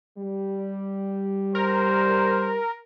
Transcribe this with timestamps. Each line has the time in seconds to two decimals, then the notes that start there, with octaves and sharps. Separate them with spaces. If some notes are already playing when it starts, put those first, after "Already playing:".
0.18 G3
1.55 A#4 C5